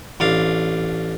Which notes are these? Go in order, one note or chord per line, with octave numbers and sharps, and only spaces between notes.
A1 D4 F5